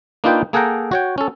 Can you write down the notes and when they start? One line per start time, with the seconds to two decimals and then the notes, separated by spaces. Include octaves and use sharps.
0.24 A#3 D4 D#4 F4 B4 G5
0.53 A#3 G#4 A4 F#5 G5 A#5
0.92 F#4 C#5 G5
1.18 C#4 A4